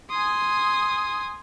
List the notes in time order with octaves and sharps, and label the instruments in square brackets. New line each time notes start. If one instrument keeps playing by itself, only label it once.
[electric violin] G#5 D#6 [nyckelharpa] C6